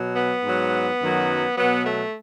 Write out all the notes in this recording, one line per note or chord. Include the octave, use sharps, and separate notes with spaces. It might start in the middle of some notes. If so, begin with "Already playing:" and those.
Already playing: B2 F#3
B3
G#2 F#3
F#2 D#3 F#3
B2 F#3 B3
A3